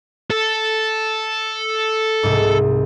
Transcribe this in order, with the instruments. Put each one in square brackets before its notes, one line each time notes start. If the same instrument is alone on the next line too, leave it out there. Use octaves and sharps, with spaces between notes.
[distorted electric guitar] A4
[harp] C2 G#2